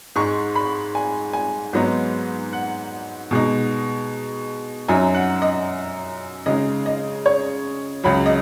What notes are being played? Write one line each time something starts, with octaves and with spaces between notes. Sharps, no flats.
G#2 G#3 D#4 C#6
B5
G#5
G#5
G#2 F#3 B3 D#4
F#5
B2 G#3 D#4
F#2 F#3 D#4 G#5
F#5
D#5
C#3 G#3 D#4 D#5
D#5
C#5
C#2 C#3 F#3 B5
D#5